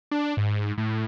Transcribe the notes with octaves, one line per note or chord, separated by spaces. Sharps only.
D4
G#2
A2